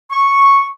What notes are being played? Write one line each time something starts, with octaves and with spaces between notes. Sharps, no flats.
C#6